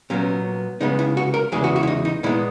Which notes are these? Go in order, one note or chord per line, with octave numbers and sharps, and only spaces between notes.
A#2 F#3 B3 C#4
C#3 G#3 B3 D#4
E4
F#4
A#4
E2 C#3 E3 G#3 G#4
F#4
F#4
E4
D#4
D#4
A#2 G#3 B3 E4